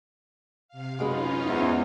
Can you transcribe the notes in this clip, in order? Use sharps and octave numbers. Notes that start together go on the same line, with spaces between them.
C3 F5
F#2 G#3 C#4 D#4 F4 B4
E2 G#2